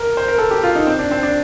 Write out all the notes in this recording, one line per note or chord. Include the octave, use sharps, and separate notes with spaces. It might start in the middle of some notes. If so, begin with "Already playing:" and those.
Already playing: A#4
C5
A#4
A4
G4
F4
D#4
C4
D4
C4
D4